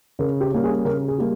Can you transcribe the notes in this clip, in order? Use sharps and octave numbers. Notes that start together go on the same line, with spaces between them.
C#3 A#4
G4
G3 A#3 C#4
G#4
C#3 A#4
G#4
G3 A#3